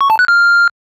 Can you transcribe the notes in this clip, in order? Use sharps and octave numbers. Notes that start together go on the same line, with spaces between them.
C#6
A5
F#6
F6